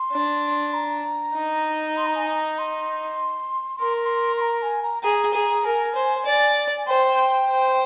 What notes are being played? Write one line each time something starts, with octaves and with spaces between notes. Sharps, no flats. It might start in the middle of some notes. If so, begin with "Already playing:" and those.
Already playing: C6
D4
A#5
D#4
C6
A#5
G#5
A#5
C6
A#4 C6
C6
C6
A#5
G#5
A#5
G#4 A#5
G#4
A#4 G#5
C5
D5
G#5
C5 G5
C5